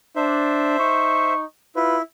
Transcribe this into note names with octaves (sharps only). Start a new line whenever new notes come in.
D4 C5 E5
D#4 C#6
E4 F4 B4